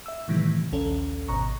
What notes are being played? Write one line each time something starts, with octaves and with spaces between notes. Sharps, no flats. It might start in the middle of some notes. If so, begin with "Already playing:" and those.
E5 E6
A2 C3 D#3 E3 G3
A#1 D#2 C#4 A4
G#1 B2 A#5 C#6